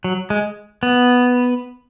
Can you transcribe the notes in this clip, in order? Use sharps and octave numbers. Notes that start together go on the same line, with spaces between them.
F#3
G#3
B3